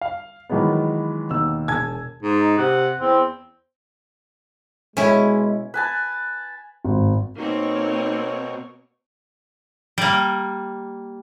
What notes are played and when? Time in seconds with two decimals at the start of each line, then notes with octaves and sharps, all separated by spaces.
0.01 F5
0.49 D#3 E3 F#3 G#3 B3
1.31 D#2 B2 E6
1.68 E1 G#5 A5 G#6
2.23 G#2
2.41 D#4
2.58 C3 F#5
2.99 E2 C4
4.97 B2 G#3 C#4 E4
5.74 B4 G#5 A5
6.85 G#1
7.37 B2 A#3 C4 D#4 C#5
9.98 G3 A#3